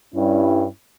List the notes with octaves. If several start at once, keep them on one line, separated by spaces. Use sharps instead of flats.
G2 G3 C#4 E4